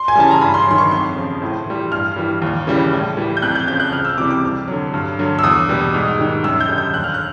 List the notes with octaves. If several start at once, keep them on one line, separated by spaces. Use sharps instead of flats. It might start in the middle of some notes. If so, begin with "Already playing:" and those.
Already playing: C6
G#5
C#3 E3 G3 A5
A#5
G2 B5
C6
D#3 F#3 C6
C#6
F2 C6
C#3 F3
A2
E3 G3
G2 F6
E3 G3
D#2
C#3 E3 G3
A2
E3 G3
G6
F2 F#6
G6
C#3 F3 G6
F#6
C#2 F6
E6
C3 E3 G3 D6
D6
F2
D3 F#3
G2
D3 F#3
E6
E2 D#6
B2 G3
G#2
D#3 G3
F#2 E6
G6
D3 G3
G6
D#2 F#6
F6
F#6